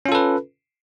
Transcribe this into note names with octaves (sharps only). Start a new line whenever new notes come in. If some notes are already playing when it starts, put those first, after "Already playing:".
C#4 F4 A4 B4